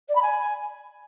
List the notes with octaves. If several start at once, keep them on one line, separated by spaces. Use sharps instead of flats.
D5
B5
G#5